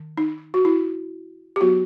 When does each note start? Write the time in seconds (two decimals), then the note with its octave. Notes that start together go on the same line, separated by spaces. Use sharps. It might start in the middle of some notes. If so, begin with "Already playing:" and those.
Already playing: D#3
0.18 D#4
0.54 F#4
0.65 E4
1.56 G4
1.60 F#3 B3 F#4